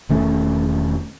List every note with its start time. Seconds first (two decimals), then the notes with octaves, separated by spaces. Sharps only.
0.09 E1 D#3 A3 C#4